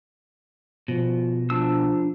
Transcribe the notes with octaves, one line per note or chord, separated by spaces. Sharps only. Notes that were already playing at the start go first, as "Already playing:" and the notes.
B2 F3
F3 D4 E6